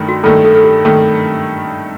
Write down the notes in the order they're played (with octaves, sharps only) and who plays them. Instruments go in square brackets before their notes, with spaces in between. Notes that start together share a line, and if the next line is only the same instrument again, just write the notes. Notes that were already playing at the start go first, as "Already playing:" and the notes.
Already playing: [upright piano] G2 D#3 A3
[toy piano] F#4
[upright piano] G2 D#3 A3 [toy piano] A4
[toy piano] A4
A4
G4
[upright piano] D#3 A3 [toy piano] A4